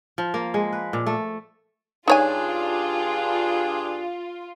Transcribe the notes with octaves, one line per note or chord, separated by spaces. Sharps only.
F3
A#3
G#3
B4
A#2
A3
G2 D4 D#4 F4 G#4 C#5 G#5